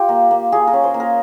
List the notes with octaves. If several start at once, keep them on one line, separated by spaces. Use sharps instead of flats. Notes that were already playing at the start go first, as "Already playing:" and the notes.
Already playing: F4 G4
A#3
A#3
A#3 G#4
A#4
C#4
C5
A#3
A#4